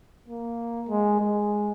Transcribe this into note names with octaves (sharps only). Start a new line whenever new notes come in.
A#3
G#3
G#3